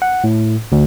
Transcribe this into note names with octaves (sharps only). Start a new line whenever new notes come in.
F#5
A2
D2